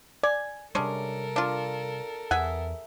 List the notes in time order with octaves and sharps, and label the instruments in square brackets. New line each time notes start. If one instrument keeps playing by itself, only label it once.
[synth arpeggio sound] D5 [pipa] G#5
[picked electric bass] C3 G3 [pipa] G#3 C#4 D4 [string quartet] A4 A#4
[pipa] D4 F4
[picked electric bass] E2 [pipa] G#4 E5 [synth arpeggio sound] F#5